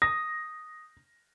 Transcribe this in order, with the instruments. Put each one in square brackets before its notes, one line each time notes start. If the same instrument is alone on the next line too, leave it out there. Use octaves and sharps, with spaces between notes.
[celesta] D#6 [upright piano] A#6